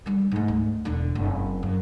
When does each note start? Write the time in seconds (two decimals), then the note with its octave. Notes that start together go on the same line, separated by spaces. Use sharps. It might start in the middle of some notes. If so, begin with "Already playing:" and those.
0.06 D3 G3
0.31 G#2 A3
0.48 D2
0.85 E1 D3
1.15 F#1 C4
1.63 F#2